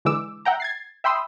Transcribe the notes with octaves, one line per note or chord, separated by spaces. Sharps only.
D3 E3 G#3 D6 E6
E5 F#5 G5 A#5
G#6 A6 C7
E5 G5 B5 C6 D#6 E6